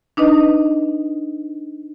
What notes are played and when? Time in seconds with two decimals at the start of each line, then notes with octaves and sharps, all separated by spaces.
0.17 D4 D#4 B4 D#5